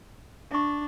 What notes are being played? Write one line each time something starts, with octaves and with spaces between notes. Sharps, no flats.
D4 E5 C#6